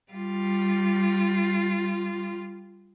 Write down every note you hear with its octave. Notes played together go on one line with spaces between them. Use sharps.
G3 F4